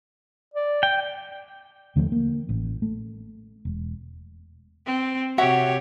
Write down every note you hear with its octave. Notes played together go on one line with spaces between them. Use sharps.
D5
G5
D#2 D3 F3 A3
A#3
A1
A3
E1
C4
C3 F#4 G4 C#5 E5 F#5